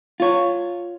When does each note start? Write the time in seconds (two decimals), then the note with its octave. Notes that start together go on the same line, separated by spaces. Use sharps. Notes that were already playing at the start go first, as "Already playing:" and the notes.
0.20 F4 C#5